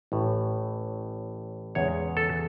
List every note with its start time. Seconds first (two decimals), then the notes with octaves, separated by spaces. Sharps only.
0.12 A1 A2 E3
1.75 E2 C#3 G#3 C#5
2.17 A4